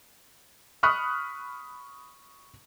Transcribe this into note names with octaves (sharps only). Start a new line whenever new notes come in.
B5 C#6 D#6 F6 F#6 B6